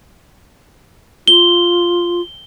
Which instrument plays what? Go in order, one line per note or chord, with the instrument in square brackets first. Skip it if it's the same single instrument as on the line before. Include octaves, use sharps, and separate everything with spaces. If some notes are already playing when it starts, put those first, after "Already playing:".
[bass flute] F4 [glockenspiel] G7